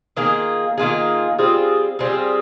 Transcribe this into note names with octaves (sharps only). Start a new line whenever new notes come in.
D#3 A#3 F4 G#4
D#3 A#3 F4 G#4
G3 C4 F4 G#4
G3 C4 F4 G#4